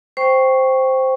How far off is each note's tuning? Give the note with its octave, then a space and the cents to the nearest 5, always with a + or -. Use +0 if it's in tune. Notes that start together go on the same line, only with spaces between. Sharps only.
C5 +0 G5 +0 C#6 +0